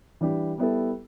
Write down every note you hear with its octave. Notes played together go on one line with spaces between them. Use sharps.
E3 G3 D4 G4
G3 B3 E4 A4